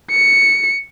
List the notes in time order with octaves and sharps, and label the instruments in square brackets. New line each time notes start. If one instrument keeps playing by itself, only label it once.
[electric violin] C#7